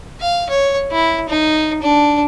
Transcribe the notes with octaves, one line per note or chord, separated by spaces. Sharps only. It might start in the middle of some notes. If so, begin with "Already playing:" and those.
F5
C#5
E4
D#4
D4